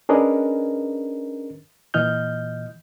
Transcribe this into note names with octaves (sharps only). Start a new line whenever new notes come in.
C#4 D4 G#4 A#4 B4 D#5
A#2 E3 D#5 F6 G6